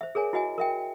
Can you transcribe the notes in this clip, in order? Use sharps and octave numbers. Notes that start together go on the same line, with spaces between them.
C5 E5
G#4 A#4 C#5 G#5
E4 F#4 D#5 G#5
A#4 E5 G5